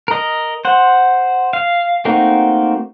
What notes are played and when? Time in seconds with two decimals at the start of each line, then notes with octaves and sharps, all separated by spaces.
0.08 A#4 D#5
0.65 C5 F#5
1.53 F5
2.05 A3 A#3 C4 D#4 F#4